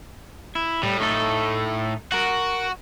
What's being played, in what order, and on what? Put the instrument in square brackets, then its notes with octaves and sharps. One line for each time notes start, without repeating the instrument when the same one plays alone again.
[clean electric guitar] E4
[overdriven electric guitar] A2 [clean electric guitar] G3
[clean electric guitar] A3 D#4 A4
[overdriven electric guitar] F#4 [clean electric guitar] A#4 F#5